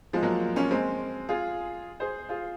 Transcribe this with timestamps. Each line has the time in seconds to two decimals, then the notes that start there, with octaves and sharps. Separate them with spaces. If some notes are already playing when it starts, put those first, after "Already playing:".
0.13 F3 G#3
0.23 F#3 A#3
0.56 A#3 C#4
0.71 G#3 C4
1.29 F4 G#4
2.00 G#4 C5
2.29 F4 G#4